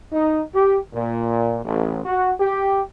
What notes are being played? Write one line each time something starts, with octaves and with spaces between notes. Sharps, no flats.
D#4
G4
A#2
A1
F#4
G4